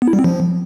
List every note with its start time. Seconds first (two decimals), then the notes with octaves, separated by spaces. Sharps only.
0.02 B3
0.08 E4
0.13 G3
0.19 C4
0.24 F3